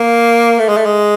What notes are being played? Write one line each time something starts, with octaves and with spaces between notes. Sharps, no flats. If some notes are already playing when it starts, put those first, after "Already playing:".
Already playing: A#3
A3
G#3
A3
G#3